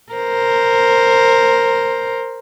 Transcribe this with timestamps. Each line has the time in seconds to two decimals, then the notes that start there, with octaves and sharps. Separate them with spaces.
0.12 A#4 C5